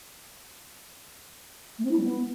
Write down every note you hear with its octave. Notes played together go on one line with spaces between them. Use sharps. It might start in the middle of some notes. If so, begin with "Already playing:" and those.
A3
C4
E4
G3
B3